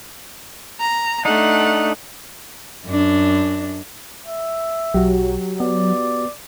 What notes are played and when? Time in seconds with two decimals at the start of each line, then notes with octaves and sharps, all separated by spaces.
0.80 A#5
1.25 A3 D4 D#4 F#5
2.86 F#2 D4
4.26 E5
4.94 B1 F#3 F#4 G4
5.60 B3 D5